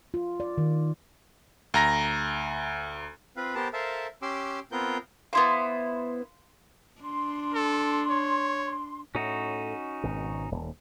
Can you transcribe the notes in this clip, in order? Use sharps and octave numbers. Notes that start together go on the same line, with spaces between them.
F4
D5
D#3
D2 A#5 A#6
C4 F4 B4 F5
B3 G4 A#4 C5 A5
A4 A#4 C5 E5 F5 A5
C#4 G4 C6 D6 E6
B3 C4 F4 A#4 G6
B3 E4 C5 F5 C6 D6
D4 C6
A4
C#5
A2 C#4 D#4 F#4
G#1 B2
D#1